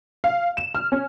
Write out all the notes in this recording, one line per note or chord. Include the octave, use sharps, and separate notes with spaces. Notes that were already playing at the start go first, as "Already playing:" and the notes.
F5
E7
F6
C#4